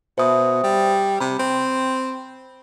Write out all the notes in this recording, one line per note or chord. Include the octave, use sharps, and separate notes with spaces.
B2 C5 E5 D#6
G3
C3 B5
C4